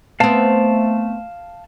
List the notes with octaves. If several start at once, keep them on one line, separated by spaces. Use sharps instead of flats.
A3 B3 C4 F5 A5